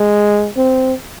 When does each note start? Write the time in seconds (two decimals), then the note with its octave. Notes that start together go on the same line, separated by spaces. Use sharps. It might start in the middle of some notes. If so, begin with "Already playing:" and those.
Already playing: G#3
0.57 C4